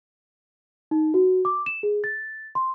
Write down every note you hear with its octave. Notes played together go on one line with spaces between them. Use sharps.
D#4
F#4
D6
E7
G#4
A6
C6